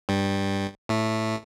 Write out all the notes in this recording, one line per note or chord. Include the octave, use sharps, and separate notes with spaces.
G2 G3
A2 A3